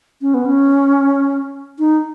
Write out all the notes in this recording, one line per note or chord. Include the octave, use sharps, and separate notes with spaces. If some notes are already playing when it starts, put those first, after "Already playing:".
C#4
B3
C#4
D#4